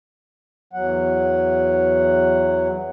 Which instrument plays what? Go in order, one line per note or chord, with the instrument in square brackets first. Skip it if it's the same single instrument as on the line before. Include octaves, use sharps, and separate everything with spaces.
[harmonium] E2 F#3 F#5